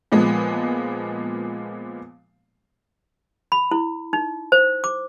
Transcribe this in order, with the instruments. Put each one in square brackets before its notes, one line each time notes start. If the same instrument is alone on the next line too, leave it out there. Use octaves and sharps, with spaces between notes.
[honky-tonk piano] A#2 F3 G#3 B3
[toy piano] B5
E4
D#4
C5
D6